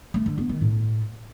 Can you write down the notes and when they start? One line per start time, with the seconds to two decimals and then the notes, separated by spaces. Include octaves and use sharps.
0.14 A3
0.26 D3
0.38 B3
0.49 D#3
0.61 A2